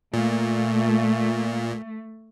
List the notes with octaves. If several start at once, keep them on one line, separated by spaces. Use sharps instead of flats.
A#2 A3